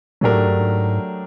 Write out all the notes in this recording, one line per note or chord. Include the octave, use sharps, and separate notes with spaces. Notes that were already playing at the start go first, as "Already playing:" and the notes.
A2 F#3 A3 D4 G4 A#4
G#2
G2
G#2